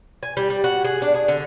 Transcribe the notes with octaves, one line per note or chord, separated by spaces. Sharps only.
G#5
G3
G3
F#4
G#4
D4
G#4
D3